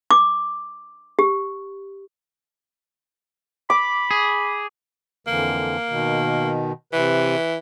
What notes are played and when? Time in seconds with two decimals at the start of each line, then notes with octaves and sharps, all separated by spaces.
0.11 D6
1.19 G4
3.70 B5 D6
4.11 G#4
5.27 F2 D3 E3 A#3
5.89 B2 D#3
6.93 C3 E3 B4